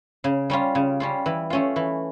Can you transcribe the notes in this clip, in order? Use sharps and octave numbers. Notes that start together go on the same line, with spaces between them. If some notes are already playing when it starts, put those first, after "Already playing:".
C#3
G3 C#4 F4
C#3
G3 C#4 F4
E3
A3 C#4 F4
E3